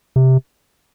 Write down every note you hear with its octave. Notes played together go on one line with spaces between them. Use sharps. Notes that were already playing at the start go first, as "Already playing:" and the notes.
C3